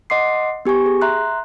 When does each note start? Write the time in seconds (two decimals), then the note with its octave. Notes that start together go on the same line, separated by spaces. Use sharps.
0.10 D#5 F#5 C6 D6 C7
0.65 B3 G4 G#5 C#6
0.86 G#4
1.02 E5 A#5 C6 F#6